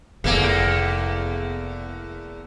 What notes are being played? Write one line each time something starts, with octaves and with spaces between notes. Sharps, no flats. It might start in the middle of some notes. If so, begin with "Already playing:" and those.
F1 E2 A3 A#3